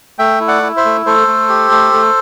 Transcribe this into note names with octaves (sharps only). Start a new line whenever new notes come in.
A3 E5 G5
E4
D5 F#5
E4
C5 E5
A3
A3 A4 C5
A3
G4
A3
A3